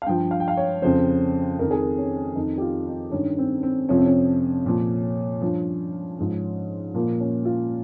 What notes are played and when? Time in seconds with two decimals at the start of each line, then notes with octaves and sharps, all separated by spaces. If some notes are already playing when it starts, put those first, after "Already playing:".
0.02 F5
0.06 G2 F3 G5
0.31 F5
0.40 G5
0.48 F5
0.57 C#5
0.82 F2 C#3 F3 C5
1.59 F2 D#3 A#4
1.71 G#4
1.82 A#4
1.98 C#4
2.35 F2 D#3 D#4
2.58 G4
2.61 F4
2.86 D#4
3.12 G2 D#3 C#4
3.38 C4
3.63 C4
3.89 F2 C3 F3 C#4
3.98 C4
4.06 C#4
4.66 A#2 F3
5.41 G2 F3
6.19 G#2 F3
6.94 A#2 F3 A#3
7.20 C#4
7.45 F4